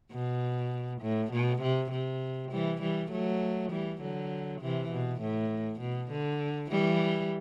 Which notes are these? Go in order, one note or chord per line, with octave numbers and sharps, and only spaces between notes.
B2
A2
B2
C3
C3
E3 G3
E3 G3
F#3 A3
E3 G3
D3 F#3
C3 E3
B2
A2
B2
D3
E3 G3